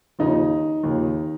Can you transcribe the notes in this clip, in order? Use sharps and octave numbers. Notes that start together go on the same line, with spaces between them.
D#2 C#3 F3 D#4
D#2 C#3 F3